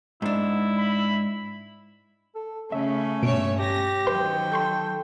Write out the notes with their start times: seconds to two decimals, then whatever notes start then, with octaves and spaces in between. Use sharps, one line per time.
0.22 G#2 D4 E4
0.78 B5
2.35 A4
2.72 C#3 A3 C#4 E5
3.23 G2 B2 C#5 E5 D7
3.59 G4 A#6
4.07 D#3 F#3 B4 C5 G5 C6
4.52 A4 C6 C#6 G6